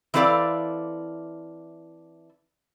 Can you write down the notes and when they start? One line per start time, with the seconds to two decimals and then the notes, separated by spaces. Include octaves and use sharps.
0.14 E3 C4 E4 A4 D5 F5